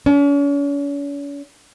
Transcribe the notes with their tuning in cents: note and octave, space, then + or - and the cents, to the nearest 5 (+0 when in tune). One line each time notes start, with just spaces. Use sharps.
C#4 +40